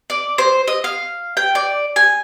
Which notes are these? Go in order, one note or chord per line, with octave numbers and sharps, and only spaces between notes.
D5
C5
D#5
F5
G5
D5
G#5